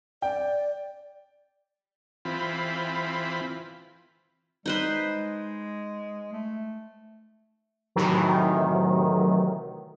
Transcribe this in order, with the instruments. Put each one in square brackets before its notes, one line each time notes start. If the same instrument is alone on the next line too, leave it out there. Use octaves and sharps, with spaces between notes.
[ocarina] D5 [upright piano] G5
[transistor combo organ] E3 C4 F4 B5
[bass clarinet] G3 [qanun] D#4 B4 C5
[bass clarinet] G#3
A3
[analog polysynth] A2 C3 D#3 E3 F#3